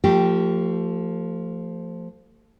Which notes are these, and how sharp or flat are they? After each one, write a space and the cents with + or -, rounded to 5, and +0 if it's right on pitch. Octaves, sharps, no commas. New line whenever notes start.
F3 +0 A3 +35 G4 -5